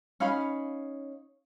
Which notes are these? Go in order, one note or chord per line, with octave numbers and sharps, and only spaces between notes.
C#4 D#4 F5 B5